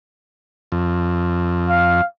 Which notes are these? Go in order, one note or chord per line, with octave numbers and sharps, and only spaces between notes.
F2
F5